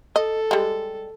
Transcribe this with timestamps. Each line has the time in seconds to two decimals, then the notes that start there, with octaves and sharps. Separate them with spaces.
0.16 A4 D#5
0.51 G3 G#3